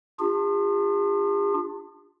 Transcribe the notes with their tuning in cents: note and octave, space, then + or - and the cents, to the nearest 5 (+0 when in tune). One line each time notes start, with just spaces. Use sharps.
D4 +20 F4 +20 G#4 -45